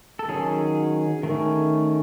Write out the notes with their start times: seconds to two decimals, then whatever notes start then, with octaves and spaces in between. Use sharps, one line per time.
0.19 A4
0.28 D#3 F#3 C#4 G#4
1.23 D#3 A3 C#4